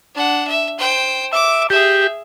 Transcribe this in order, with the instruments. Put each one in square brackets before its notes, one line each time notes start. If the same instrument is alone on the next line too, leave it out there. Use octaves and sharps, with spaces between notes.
[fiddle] D4 F#5
E5
C5 G5
[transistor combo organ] E5 [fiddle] D6
[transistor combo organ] G4 [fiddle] G#4 E5